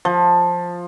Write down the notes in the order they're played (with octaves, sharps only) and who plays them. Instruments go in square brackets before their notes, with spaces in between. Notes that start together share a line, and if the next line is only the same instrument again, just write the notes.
[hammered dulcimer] F3